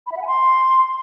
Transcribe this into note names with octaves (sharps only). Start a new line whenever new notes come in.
B5
E5
F#5
G#5
C6